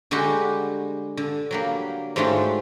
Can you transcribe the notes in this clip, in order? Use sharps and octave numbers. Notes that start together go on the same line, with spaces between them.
D3 G3 G#3 F#4 G4
D3
F#3 G3 A#3
G#2 F#3 G3 A3 D4 F4